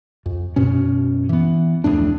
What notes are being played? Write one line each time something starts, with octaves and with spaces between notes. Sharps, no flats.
F2
F#2 B2 C#4
E3 B3
D1 F2 A2 D4